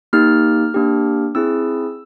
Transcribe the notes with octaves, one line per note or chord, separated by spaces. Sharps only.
A#3 D#4 G4 F6
A#3 D4 G4
C4 E4 G#4 E6